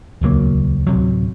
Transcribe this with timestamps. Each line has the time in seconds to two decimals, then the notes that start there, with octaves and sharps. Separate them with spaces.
0.21 D#1 C#2 F#3 A#3
0.87 D1 C3 F#3